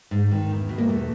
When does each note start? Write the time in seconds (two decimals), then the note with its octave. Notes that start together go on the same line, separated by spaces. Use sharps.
0.11 G#2
0.31 D#3
0.51 E2
0.69 B2
0.78 A#3
0.88 E2 A3